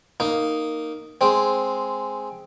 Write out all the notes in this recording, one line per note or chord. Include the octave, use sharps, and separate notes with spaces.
A#3 D#4
G#3 C4